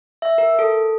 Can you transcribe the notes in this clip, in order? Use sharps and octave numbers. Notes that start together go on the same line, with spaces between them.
E5
A#4
A4